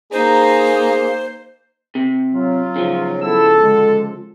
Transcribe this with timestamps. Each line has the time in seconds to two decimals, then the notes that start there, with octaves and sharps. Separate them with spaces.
0.12 A#3 D#4 G#4 C5 A#5
1.95 C3
2.34 F#3 F4
2.76 C#3 F3
3.21 B3 E4 A4 E6
3.61 D3 G#3